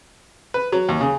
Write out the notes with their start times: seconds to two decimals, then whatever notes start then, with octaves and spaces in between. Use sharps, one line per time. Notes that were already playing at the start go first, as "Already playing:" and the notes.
0.54 B4
0.72 F#3
0.89 D#2
1.01 C#3